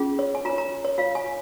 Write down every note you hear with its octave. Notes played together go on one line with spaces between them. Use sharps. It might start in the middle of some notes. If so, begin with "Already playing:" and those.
Already playing: C#4 F4 G#4
C#5
G#5
F4 C#5 A#5
A#5
C#5
F4 C#5 F5
G#5